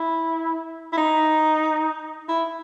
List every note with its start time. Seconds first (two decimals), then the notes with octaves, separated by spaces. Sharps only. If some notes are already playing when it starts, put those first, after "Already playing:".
Already playing: E4
0.92 E4
0.97 D#4
2.28 E4